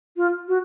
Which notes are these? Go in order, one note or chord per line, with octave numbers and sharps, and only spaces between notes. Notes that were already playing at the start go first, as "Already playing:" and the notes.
F4
F#4